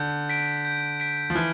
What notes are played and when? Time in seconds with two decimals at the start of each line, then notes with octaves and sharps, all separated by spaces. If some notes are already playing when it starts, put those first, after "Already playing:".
Already playing: D3 G6
0.29 B6 D7
0.65 G6
1.00 B6 D7
1.30 F3
1.35 E3 F6